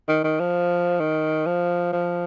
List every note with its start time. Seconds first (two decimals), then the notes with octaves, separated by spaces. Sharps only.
0.08 D#3
0.24 D#3
0.40 F3
1.00 D#3
1.46 F3
1.93 F3